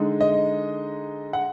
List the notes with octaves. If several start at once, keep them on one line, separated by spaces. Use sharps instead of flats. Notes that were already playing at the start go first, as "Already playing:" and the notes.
Already playing: D3 G#3 D#4
D#5
F#5